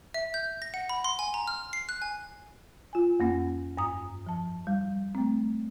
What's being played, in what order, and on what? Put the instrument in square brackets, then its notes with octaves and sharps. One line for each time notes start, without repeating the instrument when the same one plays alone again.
[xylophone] E5
G6
A#6
F#5
B5
C6
G#5
A#5
F6
C7
F#6
G#5
[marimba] F4 G#5
F2 A#3 C#4 F#5
G2 A#5 D#6
F3 A5
G3
A3 C4